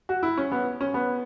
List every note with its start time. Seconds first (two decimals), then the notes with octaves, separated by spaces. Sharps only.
0.09 F#4
0.23 E4
0.38 C#4
0.52 B3
0.81 C#4
0.94 B3